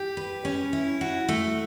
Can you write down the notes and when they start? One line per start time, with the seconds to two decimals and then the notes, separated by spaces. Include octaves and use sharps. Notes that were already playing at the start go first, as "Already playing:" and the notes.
Already playing: G4
0.17 B4
0.45 C#4
0.73 E4
1.01 F#4
1.28 A3